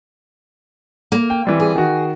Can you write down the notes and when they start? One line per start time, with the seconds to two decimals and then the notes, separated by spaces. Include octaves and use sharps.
1.12 A#3
1.30 G5
1.45 E3 G3 C4
1.60 G#4
1.76 D#3 F#4